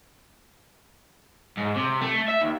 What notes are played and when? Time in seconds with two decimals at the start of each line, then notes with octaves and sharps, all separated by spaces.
1.57 G#2
1.76 C3
2.01 A3
2.28 E5
2.40 D#2